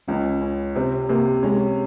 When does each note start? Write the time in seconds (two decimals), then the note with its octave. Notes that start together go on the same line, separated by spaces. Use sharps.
0.08 C#2 C#4
0.42 C#4
0.76 C3 C4
1.09 C3 A#3
1.43 G#3 C#4